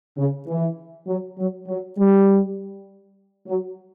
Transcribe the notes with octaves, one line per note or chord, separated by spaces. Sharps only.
C#3
E3
F#3
F#3
F#3
G3
F#3